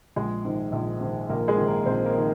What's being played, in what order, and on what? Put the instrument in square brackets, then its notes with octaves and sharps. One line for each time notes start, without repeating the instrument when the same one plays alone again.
[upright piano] A#1 G#3 G#4
G#2 D#3
A#1
G#2 D#3
A#1 A#3 A#4
G#3 G#4
G#2 D#3
A#3 A#4
A#1 C4 C5
A#3 A#4
D#3